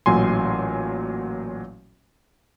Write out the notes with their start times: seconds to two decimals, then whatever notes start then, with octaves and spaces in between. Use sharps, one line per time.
0.06 A1 A#2 F#3 G#5 C6